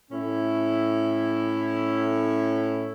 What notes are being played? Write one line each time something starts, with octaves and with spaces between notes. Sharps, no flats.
A2 C#4 E4